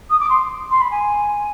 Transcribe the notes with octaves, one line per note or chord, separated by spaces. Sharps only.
D#6
D6
C6
C6
B5
G#5